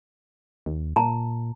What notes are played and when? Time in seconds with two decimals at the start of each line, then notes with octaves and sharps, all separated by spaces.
0.66 D#2
0.96 A#2 A5 A#5